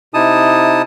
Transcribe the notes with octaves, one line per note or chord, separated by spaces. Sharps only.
C3 D#4 E4 A5 D#6